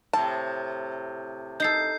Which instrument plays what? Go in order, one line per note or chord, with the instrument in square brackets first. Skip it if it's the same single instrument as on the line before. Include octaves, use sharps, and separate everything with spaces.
[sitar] A2 C3 [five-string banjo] A5
[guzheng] D#4 A4 [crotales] G6 C7